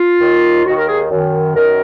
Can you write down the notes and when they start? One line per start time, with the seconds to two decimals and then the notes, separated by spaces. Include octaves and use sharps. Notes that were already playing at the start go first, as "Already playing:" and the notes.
Already playing: F4
0.21 D#2 D#3
0.66 D#2 D#3 F#4
0.77 A#4
0.88 G#4
1.11 F#2 D#3
1.55 F#2 D#3 A#4